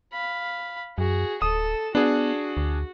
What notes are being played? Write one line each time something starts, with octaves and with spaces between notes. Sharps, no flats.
F5 B5
F#2 F#4 G#4
D1 A4 D#6 E7
B3 D4 F#4 G#4
D2